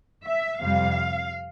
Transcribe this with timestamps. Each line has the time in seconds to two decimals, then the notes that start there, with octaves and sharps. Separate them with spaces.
0.25 E5
0.61 F2 C3 G3 F5